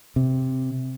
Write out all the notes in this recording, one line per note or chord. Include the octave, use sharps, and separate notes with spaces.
C3